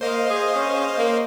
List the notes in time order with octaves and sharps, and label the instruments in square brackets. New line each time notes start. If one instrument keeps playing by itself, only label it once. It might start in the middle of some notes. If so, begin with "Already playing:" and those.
[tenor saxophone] A#3 [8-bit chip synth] C5 D#5 F5
[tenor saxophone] G#4
C#4
A#3